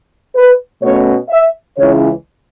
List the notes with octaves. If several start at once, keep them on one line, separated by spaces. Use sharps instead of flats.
B4
B2 A3 C#4 C#5
E5
C#2 C#3 E3 C#5